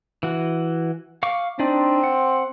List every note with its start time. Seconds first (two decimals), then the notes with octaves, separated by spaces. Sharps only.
0.23 E3 F#4
1.23 F5 C#6 D6
1.59 C4 D4 D#4 D5
2.04 F#5